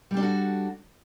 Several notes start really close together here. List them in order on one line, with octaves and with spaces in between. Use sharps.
G3 G4 D4 A4 F#4